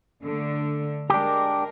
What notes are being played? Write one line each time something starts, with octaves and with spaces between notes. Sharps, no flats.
D3 A3
G#3 D4 G4 A#4